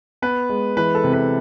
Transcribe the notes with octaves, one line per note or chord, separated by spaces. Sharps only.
B3 B4
G#3
E3 B4
A4
C3
B4